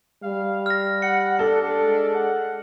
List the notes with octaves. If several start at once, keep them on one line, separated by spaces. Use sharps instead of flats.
G3 F5
F6 A#6
F#5 C#7
D4 A4
G#3
F#5